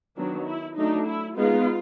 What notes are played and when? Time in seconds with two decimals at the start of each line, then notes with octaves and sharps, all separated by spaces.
0.17 D#3 F#3 B3 D4
0.46 E4
0.77 F#3 A3 D4 D#4
1.06 E4
1.36 G#3 B3 D#4 F4